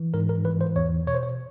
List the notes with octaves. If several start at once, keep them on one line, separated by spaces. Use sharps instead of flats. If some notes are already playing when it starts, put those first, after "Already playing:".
Already playing: E3
G#2 A#4
A#4
E3 B4
C5
E2 C#5
B2 C#5
C5
C#5